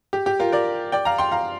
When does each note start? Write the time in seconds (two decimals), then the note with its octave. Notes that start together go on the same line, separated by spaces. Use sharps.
0.13 G4
0.26 G4
0.39 F4 A#4
0.52 A#4 D5
0.92 D5 G5
1.05 F5 A#5
1.18 G5 C6
1.32 F5 A#5